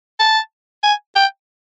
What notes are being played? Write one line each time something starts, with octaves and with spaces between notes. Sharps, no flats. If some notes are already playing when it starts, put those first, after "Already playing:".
A5
G#5
G5